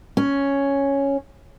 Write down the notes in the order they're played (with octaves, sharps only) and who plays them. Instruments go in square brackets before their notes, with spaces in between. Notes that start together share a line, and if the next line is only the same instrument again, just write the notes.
[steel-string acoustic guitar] C#4